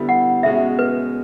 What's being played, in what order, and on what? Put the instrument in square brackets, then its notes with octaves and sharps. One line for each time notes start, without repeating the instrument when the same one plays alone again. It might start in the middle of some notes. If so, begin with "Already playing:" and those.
Already playing: [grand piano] D3 G3 B3 E4
[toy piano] F#5
[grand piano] B2 G#3 C#4 F#4 [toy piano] E5
[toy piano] B4